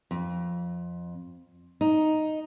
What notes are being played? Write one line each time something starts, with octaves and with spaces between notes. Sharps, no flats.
F2
D#4